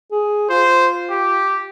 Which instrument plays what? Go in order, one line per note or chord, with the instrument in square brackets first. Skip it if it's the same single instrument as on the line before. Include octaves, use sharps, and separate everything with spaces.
[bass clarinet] G#4
[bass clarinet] F4 [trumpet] C5
[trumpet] G4